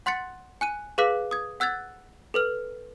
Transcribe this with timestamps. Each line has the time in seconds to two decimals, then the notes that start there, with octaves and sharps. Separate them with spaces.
0.06 F#5 C6 F#6 A6 C#7
0.61 G#5 F#6 D#7
0.98 G#4 B4 F5 D6 F#6 B6
1.31 D#6 G#6
1.60 F#5 E6 F#6 G#6 A6
2.34 A4 B4 F6